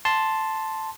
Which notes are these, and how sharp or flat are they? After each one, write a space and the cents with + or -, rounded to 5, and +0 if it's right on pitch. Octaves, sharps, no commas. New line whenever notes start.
A5 +0 C6 +0